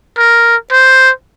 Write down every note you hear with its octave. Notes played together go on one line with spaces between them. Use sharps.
A#4
C5